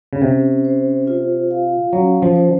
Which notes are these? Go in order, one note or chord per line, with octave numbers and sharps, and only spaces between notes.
C#3
C3 C#4
C5
F4
F5
F#3 C#4
F3
C5